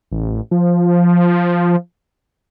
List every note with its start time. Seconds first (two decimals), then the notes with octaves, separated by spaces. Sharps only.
0.11 A1
0.51 F3